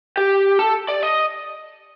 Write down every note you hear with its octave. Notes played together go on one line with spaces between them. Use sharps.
G4
A4
D5
D#5